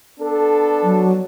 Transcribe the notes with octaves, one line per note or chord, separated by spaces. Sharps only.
B3 D4 A4
F#3